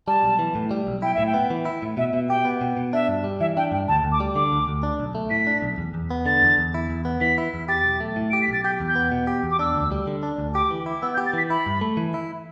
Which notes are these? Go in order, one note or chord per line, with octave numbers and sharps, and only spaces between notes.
G3 A5
B1
E3
A2
G3
B1
E4 G5
A2 E5
G5
B3
E3
E4
A2
B2 E5
B2 E5
G4 G5
B3
B2
B2
D4 E5
G2
G3
E3 E5
D4 G5
G2 G5
D2 A5
D2
D6
G3
D3 D6
D2
D2
D4
B1
A3
A2 B6
D4
B1
E2
E2
B3
D3 A6
E2
E2
E4
E2
B3
E3 B6
E4
E2
G4 A6
B1
A3
A2
G4 D7
B6
B1 A6
G4 G6
E2
G6
B3
B2
G4
E2
D6
D4 E6
D2
G3
D3
D4
D2
G4 D6
E3
E4
B3 E6
G6
G4
A6
E3 B6
E4 B5
G2
A3
E3
E4